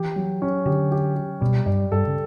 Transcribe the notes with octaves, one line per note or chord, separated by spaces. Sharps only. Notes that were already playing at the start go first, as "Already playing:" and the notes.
Already playing: E3 G4
F#3
C#4
D3 G4
G4
G4
B2 G3
G2 D5
G2 A4
C#3